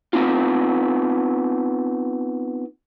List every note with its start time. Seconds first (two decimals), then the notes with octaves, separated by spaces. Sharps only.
0.13 B3 C4 D#4 F4